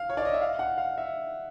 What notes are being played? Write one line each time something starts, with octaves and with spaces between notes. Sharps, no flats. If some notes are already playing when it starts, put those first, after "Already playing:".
Already playing: F5
C#5
D5
D#5
E5
F5
F#5
F5
E5